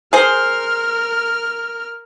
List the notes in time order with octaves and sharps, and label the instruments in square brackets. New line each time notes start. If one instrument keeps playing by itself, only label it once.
[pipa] G#4 C5 [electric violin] A#4 F6